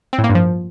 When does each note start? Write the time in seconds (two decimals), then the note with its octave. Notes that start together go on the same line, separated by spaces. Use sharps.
0.13 C4
0.18 A2
0.24 A#3
0.29 G2
0.35 F3